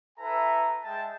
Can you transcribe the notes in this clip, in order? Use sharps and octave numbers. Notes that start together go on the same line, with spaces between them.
E4 A4 B4 E5 G#5 A#5
G#3 E5 G5 A5